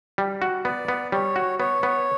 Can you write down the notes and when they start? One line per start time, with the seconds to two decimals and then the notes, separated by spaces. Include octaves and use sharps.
0.18 G3
0.42 F#4
0.65 B3 D5
0.88 B3
1.12 G3 C#5
1.36 F#4
1.60 B3 C#5
1.83 B3